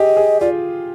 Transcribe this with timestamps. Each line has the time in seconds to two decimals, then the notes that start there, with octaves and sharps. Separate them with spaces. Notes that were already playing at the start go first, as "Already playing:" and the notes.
Already playing: G4 G#4 D#5
0.17 G#4
0.40 F4 D5